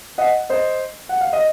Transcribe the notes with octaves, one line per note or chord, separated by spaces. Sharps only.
D#5 F#5
C5 D#5
F#5
F5
D#5